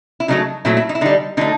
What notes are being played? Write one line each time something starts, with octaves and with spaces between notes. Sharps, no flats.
E4
C#3 F#3 A3 D#4
A#2 F#3 A3 E4
E4
D#4
E4
D3 G3 D#4
D3 F#3 A3 D#4